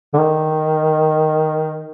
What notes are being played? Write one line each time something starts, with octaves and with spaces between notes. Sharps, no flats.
D3
D#3